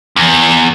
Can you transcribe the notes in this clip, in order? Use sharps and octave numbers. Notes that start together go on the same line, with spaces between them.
E2